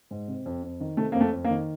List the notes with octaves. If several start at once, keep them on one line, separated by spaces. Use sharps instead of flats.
G#2
C3
F2
F2
D#3
C3 A3
F2 A#3
A3
F2
A#3
D#3